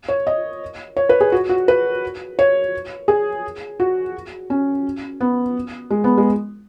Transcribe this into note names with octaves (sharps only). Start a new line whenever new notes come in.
C#5
D#5
C#5
B4
G#4
F#4
F#4
B4
C#5
G#4
F#4
C#4
B3
G#3
B3
G#3